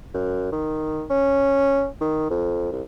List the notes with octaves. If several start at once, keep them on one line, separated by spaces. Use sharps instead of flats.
F#2
D#3
C#4
D#3
F2
C2